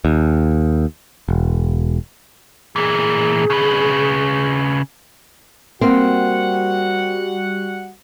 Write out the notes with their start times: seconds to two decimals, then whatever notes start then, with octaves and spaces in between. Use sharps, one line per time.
0.05 D#2
1.29 E1
2.76 A#2 E3 G#4
3.50 C#3 B4
5.81 G3 A#3 C4 F#4 F#5